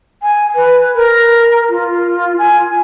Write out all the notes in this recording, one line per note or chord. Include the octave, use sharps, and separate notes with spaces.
G#5
B4
A#4
F4
G#5